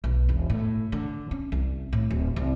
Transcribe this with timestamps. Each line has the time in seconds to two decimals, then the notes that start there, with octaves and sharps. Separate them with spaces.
0.04 B1
0.29 E1
0.50 A2
0.92 D3
1.31 C#4
1.52 C2
1.93 A2
2.10 D1
2.36 C2